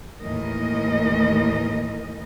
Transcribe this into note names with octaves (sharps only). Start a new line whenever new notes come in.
D#2 A2 E3 A#4 D#5